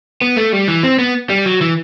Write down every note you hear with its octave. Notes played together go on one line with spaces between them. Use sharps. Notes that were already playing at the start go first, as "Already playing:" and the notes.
B3
A3
G3
E3
C4
B3
G3
F#3
E3